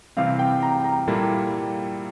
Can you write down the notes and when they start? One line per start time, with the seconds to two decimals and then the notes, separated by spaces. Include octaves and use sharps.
0.17 C3 E3 G3 C4 F5
0.39 G5
0.62 A#5
0.84 A#5
1.08 A#2 G3 A#3 E4 A4